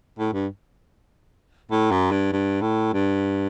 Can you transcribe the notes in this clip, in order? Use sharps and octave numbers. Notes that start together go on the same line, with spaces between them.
A2
G2
A2
F#2
G2
G2
A2
G2